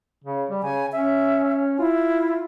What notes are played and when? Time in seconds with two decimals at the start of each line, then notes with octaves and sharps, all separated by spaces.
0.24 C#3
0.50 G3
0.63 C#3 G#5
0.93 C#4 E5
1.79 E4 F4